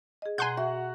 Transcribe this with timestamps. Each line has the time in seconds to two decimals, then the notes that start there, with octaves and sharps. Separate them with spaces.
0.22 G#4 D#5
0.38 B2 F#5 G#5 A#5 C6 G6
0.57 F#4 E5